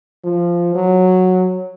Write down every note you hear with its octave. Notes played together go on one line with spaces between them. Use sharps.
F3
F#3